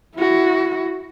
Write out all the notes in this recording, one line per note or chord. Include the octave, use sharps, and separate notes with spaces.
E4 F#4